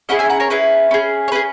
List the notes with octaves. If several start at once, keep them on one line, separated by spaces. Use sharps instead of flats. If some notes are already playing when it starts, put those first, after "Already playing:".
C#4 E4 G#4 D#5 F#5
E5 G#5
F#5 A#5
A#4 C#5
C#4 E4 G#4 B4
C#4 G#4
C#5
C#4 G#4 B4